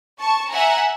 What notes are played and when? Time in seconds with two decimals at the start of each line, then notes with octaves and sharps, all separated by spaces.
0.19 A5 C#6
0.50 E5 F#5 G#5 A#5